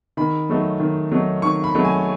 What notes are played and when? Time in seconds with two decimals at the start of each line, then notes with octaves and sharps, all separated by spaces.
0.17 D#3 B5
0.49 F#3 A3 D#4
0.80 D#3
1.12 F#3 A3 D#4
1.42 D#3 C#6
1.64 B5
1.75 F#3 A3 D#4
1.85 G#5